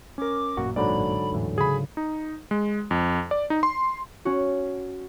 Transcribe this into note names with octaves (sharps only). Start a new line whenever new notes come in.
C#4 A#4 D6
A1 F#2 A#2 F#4
G#2 D3 F#3 D5 B5
E2 A2 E3
C#3 G#4 B5
D#4
G#3
F2
D5
D#4
C6
C#4 F#4